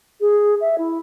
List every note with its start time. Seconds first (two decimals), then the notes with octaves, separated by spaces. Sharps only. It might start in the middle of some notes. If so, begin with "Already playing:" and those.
0.20 G#4
0.61 E5
0.78 E4